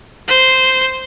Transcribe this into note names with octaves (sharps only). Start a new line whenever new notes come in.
C5